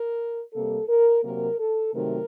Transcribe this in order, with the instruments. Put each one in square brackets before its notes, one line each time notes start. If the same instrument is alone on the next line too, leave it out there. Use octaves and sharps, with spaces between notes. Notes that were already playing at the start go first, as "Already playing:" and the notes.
Already playing: [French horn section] A#4
C3 G3 A#3 A4
A#4
C3 F#3 A#3 A#4
A4
C3 D#3 F#3 A3 A#4